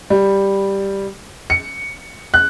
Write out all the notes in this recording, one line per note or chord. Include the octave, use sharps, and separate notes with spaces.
G3
C#7
F#6